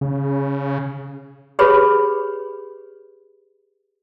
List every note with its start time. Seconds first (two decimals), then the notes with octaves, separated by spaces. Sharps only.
0.01 C#3
1.59 G4 G#4 B4 C#5 B5